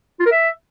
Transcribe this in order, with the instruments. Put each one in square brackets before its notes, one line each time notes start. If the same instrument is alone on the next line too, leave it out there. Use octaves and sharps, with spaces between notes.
[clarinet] F4
A#4
E5